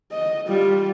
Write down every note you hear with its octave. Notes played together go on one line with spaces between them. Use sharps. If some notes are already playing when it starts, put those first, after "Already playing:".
D#5
G3 F4